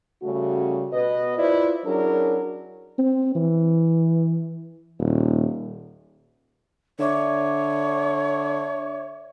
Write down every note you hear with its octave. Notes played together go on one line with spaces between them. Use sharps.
C#3 G3 A3 C#4 F#4
B2 B4 D#5
E4 F4 B4 C5 D5
F#3 C#4 D4 E4 G#4 A#4
C4
E3
D#1
D3 C#5 D5 E5 D6